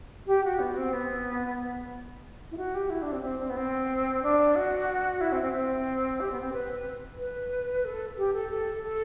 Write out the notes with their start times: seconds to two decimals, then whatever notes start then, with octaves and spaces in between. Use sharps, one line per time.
0.27 G4
0.44 F#4
0.60 B3
0.77 C4
0.93 B3
2.51 E4
2.57 F#4
2.75 G4
2.90 E4
3.02 D4
3.12 C4
3.23 C4
3.40 C4
3.50 B3
3.57 C4
4.23 D4
4.56 F#4
5.21 E4
5.32 C4
5.42 C4
5.53 C4
6.20 G4
6.31 B3
6.41 C4
6.53 B4
7.18 B4
7.85 A4
8.17 G4
8.34 A4
8.50 A4
8.83 A4